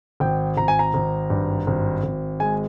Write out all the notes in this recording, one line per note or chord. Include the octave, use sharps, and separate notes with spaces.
G#1 G5
G#1 A#5
G#5
A#5
G#1
G2
G#1
G#1
G#3 G#5